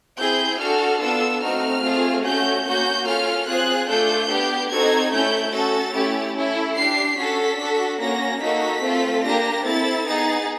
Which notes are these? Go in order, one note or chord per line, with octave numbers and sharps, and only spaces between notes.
C4 E4 G#4 G6
D4 F#4 A4 F6
B3 D4 F4 A4 E6
A3 C4 D#4 F#4 F6
A3 C4 F4 G#4
A3 C#4 F#4 G6
A#3 C#4 F#4 G6
C#4 F4 A4 F6
C4 F4 G#4 F#6
A3 D4 F4 A4 G6
B3 D4 G4
C4 D#4 F#4 A4 G#6
A3 C#4 E4 G6
C#4 F#4 A4 A6
A3 C#4 E4 G4
C#4 E4 A4
D4 G4 C7
C#4 F#4 A4 B6
D4 F#4 A4
A#3 C#4 F#4 A#6
A#3 D#4 F#4 A4 B6
A3 C4 F4 A4
A#3 D4 G4 A#6
C4 E4 A4 A6
B3 D#4 G#4 A6